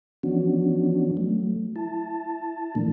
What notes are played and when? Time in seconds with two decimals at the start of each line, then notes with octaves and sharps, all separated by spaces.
0.23 E3 F3 B3 C#4 D4 F#4
1.17 F#3 A3
1.76 E4 A5
2.75 A#2 E3 F3 A3 A#3 D4